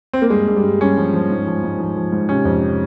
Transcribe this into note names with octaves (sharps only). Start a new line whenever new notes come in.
C4
A#3
G2 G#3
G2
G3
G2
G2 C#4
F3
F3
G#2
F3
G#2
F3
F3
G#2
C3 C#4
F2